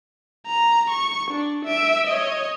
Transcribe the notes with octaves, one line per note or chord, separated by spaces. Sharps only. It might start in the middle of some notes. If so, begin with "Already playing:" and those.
A#5
C#6
D4
E5 D7
C#5 D#5